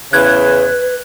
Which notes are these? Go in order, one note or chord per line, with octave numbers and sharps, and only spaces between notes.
E2 C#3 B4 F#6 G#6